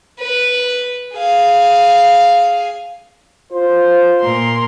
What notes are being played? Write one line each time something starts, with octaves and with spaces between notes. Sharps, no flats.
B4
G#4 F5
F4 C5
A#2 A#4 C6